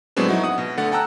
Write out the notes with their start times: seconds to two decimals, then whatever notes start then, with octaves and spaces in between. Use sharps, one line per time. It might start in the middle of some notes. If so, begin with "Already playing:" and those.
0.16 A2 F#3 G#3 B3 C4 D4
0.28 F#3 D#4 E4 F#4
0.44 F#5 D#6
0.58 B2
0.77 D3 A3 F#5 A6
0.91 F#5 G5 A5 A#5 E6 F#6